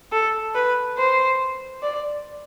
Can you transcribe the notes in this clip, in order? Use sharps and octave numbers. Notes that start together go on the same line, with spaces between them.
A4
B4
C5
D5